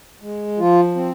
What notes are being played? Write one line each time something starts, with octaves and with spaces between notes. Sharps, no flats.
G#3
F3 F4
C4